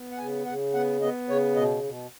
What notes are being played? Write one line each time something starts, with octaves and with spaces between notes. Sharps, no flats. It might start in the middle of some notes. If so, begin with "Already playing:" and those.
Already playing: B3
F#5
C#3 G#5
C#3 F#5
B3 F#5
B3 D#5
C#3 C#5
B2 D#5
B2